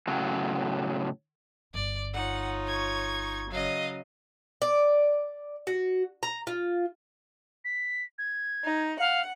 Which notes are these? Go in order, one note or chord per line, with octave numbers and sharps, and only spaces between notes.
A2 C#3 F#3
G1 D5
D#4 F4 C#5 F#5
C#6 G#6
C#3 F#3 D#5 F5
D5
F#4
A#5
F4
B6
G#6
D#4
F5 F#5